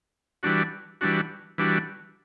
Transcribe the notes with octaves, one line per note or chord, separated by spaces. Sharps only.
E3 G3 D4 F#4
E3 G3 D4 F#4
E3 G3 D4 F#4